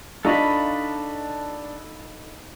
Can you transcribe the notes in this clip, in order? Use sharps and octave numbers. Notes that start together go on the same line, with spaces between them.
D4 D#4 F4 A4 D#5 B5 C#6